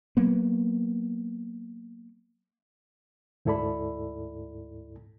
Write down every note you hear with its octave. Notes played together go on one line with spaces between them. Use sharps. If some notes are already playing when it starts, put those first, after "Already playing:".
F#3 A#3 B3
D2 G#2 E4 A4 D5 B5